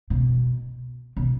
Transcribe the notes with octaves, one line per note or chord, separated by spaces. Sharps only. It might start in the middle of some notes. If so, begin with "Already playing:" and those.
B2
B2